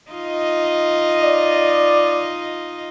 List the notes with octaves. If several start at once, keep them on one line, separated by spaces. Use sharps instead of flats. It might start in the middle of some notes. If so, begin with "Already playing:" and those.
D#4 F4 D#5
D5